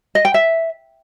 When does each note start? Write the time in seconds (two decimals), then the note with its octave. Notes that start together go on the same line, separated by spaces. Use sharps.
0.15 D#5
0.25 G5
0.34 E5